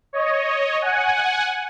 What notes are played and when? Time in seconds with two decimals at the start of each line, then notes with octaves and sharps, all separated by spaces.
0.13 C#5 D#5
0.82 F#5 G#5